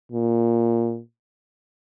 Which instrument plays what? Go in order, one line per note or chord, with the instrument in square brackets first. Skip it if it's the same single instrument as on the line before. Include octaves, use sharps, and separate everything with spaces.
[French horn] A#2